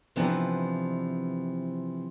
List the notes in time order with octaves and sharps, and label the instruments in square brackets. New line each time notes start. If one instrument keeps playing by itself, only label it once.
[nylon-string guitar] C3 E3 F3 B3 D4 D#4